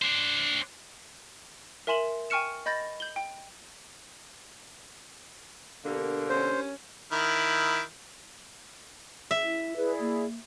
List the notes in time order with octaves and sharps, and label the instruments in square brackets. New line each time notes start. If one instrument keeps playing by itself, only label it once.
[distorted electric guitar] D4 C5
[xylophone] A#4 E5 G#5 C6 E7 F#7
G5 G#5 C#6 F6 C#7 E7
D#5 B5 G6 A6 A#6
G6 F#7 G7
G5
[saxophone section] B2 D3 A#3 [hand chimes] D4 G4 A#4
[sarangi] C#4 [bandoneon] C5
[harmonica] D#3 E4
[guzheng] E5
[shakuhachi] E4
[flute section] E4 G#4 D5 [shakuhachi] B4
[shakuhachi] A#3